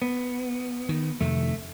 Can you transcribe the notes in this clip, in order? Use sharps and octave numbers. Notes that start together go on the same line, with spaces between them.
B3
D#3
F2 C3 D#3 A3